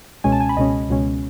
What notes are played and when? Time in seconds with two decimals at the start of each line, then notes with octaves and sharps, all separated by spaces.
0.24 C#2 B2 G#3 C#4 G#5
0.32 A5
0.40 G#5
0.49 B5
0.57 C#2 B2 G#3 C#4 D#5
0.89 C#2 B2 G#3 C#4